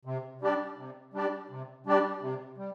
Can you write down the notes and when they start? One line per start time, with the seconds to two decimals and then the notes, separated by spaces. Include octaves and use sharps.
0.05 C3
0.41 G3 D4 G4 D5
0.78 C3
1.14 G3 D4 G4 D5
1.50 C3
1.86 G3 D4 G4 D5
2.22 C3
2.58 G3